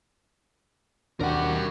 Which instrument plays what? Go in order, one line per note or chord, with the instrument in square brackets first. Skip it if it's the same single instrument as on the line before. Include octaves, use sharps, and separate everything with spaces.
[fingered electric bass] D#2 B2 D4 [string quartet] D#3 F#4 G4 [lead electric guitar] A#4 F#5